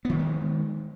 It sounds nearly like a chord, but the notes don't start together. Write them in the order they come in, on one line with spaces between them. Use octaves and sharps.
B3 D#3 F3 G#3